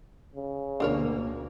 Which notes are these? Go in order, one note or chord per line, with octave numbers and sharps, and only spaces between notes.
C#3
D2 B2 A#3 D4 A#4 C#5